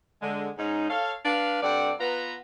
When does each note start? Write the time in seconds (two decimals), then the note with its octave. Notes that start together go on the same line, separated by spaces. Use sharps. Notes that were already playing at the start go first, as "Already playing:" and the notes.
0.22 D3 G#3
0.58 G#2 C#4 D#4
0.89 A4 C#5 F5
1.25 D4 B4 F5
1.63 G2 C4 A4 D5 F#5
2.00 B3 F4 B4 A#5